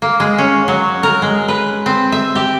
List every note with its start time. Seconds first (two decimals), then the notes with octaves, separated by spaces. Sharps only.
0.02 A#3
0.20 G#3
0.38 C#4
0.68 F#3
1.03 A#4
1.22 G#3
1.48 B4
1.86 C4
2.12 E5
2.35 G4